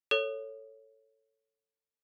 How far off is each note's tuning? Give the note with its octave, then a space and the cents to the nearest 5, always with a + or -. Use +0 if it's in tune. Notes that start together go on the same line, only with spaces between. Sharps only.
A4 +10 C#5 +0